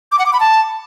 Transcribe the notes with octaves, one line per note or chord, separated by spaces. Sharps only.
D6
F#5
D6
B5
A5